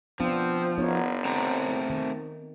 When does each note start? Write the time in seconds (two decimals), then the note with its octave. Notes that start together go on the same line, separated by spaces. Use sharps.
0.20 F3 B3 C4 D4
0.78 F#1 B3 D#4 C#5
1.25 A3 C4 A#5
1.90 D#3